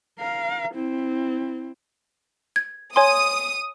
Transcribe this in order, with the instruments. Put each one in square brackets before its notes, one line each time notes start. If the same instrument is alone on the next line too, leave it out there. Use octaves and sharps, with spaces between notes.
[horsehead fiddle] A#4 F5
C4 E4
[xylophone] G#6
[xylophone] C#5 G#5 C6 [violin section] D#6